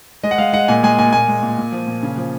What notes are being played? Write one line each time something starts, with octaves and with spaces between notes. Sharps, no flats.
G#3 D#5
F#5
G#3 F5
G#3 F#5
A#2 G#5
G#3 G#5
A#2 G#5
A#2 G#5
G#3
A#2
A#2
F3
A#2
C#3
F3